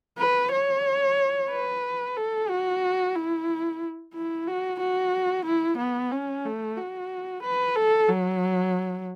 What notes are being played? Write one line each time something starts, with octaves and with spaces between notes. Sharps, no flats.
B4
C#5
B4
A4
F#4
E4
E4
F#4
F#4
E4
B3
C#4
A3
F#4
B4
A4
F#3